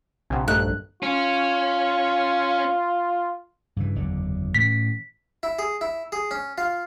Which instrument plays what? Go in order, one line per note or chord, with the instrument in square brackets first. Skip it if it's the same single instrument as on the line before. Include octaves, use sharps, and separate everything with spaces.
[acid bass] A#1 [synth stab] C3 [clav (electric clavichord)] F#5 G#5
[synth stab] G2 [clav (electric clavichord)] A3 D#4 A4 [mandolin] F#6
[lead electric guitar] C#4 [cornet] F4
[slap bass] G2 C#3 E3
F#1 E2 D3
[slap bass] A2 E3 C#4 [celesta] B6
[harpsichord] E4
G#4
E4
G#4
C#4
F4